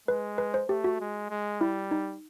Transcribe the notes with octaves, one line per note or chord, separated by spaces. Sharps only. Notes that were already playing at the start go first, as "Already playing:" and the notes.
G#3 B4
B4
C5
A3 G4
F#4
G#3
G#3
G3 E4
D#4